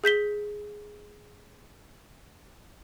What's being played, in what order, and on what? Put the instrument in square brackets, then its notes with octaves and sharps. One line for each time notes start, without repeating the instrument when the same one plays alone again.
[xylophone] G#4 G6 B6 G7